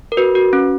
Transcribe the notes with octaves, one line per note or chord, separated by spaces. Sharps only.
A#4
F#4 B4
F#4
C#4